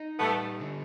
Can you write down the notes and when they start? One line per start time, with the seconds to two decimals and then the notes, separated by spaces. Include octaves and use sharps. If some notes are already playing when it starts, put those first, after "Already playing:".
Already playing: D#4
0.19 G3 A3 B3
0.60 D3